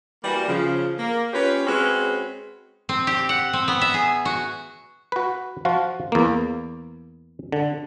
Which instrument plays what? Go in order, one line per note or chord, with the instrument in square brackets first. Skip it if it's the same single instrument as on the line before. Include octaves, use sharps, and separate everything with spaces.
[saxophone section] E3 G3 A#3 F#4 B4 D5
C#3 F3
A#3
C#4 F4 G4 B4 C#5
G#3 C4 C#4 F#4 B4 C5
[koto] C4
G4
F#5
C4
B3
E5
G#4
F#4
[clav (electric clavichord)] F#4 B4
F3 F4 F#4
E2 A#3
D3